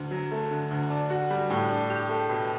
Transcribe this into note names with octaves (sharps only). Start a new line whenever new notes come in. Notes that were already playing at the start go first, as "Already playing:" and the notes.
Already playing: D2
F#3
A3
D3
D2
D4
F#4
G3
A2
D4
G4
A3
B2